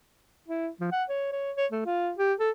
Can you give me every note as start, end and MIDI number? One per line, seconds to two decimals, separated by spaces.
0.48 0.69 64
0.80 0.89 53
0.92 1.04 78
1.09 1.28 73
1.32 1.52 73
1.56 1.66 73
1.72 1.82 57
1.86 2.12 65
2.18 2.33 67
2.39 2.50 69